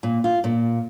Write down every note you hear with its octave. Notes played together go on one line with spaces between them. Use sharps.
A#2
F4
A#2